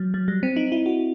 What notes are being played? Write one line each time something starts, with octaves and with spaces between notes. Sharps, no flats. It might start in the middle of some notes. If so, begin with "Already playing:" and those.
Already playing: F#3
F#3
G3
C4
D#4
E4
F#4